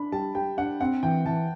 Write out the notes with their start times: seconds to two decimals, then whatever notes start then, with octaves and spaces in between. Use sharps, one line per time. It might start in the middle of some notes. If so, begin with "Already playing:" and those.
Already playing: D4 B5
0.12 G3 A5
0.35 G3 G5
0.57 D4 F#5
0.80 C4 F#5
1.03 E3 G5
1.25 E3 A5